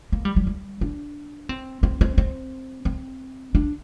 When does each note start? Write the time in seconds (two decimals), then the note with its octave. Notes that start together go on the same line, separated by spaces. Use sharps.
0.12 A#3
0.25 G3
0.36 G3
0.47 G3
0.81 D4
1.49 C4
1.83 C4
2.01 C4
2.18 C4
2.85 C4
3.55 D4